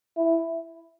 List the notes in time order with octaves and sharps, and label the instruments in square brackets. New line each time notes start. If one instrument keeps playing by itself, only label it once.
[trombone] E4